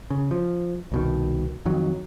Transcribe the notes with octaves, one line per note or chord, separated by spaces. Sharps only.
C#3
F3
C2 B2 D#3
F2 D#3 F#3